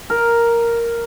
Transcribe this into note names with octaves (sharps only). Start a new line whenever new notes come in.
A#4